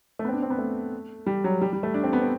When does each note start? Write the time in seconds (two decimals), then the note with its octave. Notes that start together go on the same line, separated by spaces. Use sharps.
0.19 A3
0.25 B3
0.28 C4
0.33 D4
0.42 C4
0.50 B3
0.59 A3
1.26 G3
1.44 F#3
1.61 G3
1.73 G3
1.83 A3
1.94 D4
2.04 C4
2.13 B3
2.22 C4